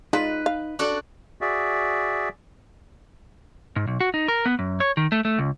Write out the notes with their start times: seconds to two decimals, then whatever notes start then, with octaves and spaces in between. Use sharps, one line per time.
0.13 G#3 D#4 F4 B4 D5
0.46 F5
0.79 D4 F#4 A4
1.41 F#4 G#4 D5 E5
3.76 G#2
3.87 B1
4.00 F#4
4.14 D#4
4.28 A#4
4.46 B3
4.59 F#2
4.80 C#5
4.97 D#3
5.12 A3
5.25 A3
5.39 C#2